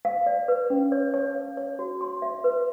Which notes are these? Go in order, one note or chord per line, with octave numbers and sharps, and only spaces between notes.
F5
D5
B4
C#4
C#5
C#5
F5
C#5
F#4
C6
E5
B4